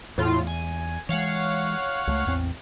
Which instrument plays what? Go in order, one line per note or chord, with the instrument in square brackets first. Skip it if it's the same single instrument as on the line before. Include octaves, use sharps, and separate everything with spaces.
[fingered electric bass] E2 [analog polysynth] A2 F4
[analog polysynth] G#5
[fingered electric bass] E3 G#3 [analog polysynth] C#5 F5 F#5
[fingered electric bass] C#2 G3 A3
A1 E2 C4